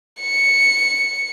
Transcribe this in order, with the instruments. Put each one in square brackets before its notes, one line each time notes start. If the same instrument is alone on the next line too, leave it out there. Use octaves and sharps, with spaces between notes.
[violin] C#7